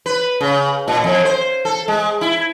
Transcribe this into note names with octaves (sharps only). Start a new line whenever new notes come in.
B4
C#3
A#2
F2
C5
A4
G#3
E4